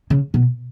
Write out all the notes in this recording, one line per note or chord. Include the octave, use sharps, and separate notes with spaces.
C#3
B2